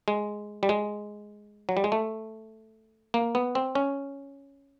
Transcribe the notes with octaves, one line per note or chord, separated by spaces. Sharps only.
G#3
G3
G#3
F#3
G3
G#3
A3
A#3
B3
C4
C#4